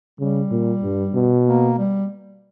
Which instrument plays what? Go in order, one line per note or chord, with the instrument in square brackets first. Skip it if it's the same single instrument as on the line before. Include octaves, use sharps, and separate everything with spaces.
[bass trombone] C#3 [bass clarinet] G3
[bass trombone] A#2
G2
B2
[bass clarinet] A#3
G3